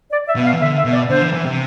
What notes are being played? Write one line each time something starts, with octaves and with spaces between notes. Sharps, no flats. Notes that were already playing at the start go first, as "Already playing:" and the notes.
D5
E5
B2
F5
E3
D3 E5
E5
B2
D5
D3 C5
E3
E3
C3